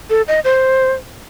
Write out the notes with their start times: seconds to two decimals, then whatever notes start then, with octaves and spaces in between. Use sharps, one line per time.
0.10 A4
0.27 D#5
0.44 C5